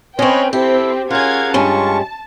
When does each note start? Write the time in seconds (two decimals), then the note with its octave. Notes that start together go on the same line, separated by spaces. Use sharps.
0.19 C4 C#4 B4 C#5 D#5 G5 C6
0.53 C4 E4 G4 A4 C5
1.11 C#4 F4 G#4 A#4 F5 F#5 G#6
1.54 G2 G#3 C#4 F4 A5 C#6